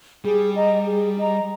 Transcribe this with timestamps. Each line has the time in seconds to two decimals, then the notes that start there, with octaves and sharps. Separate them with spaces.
0.24 G3 G#4
0.55 D#5 A#5
0.86 G#4
1.17 D#5 A#5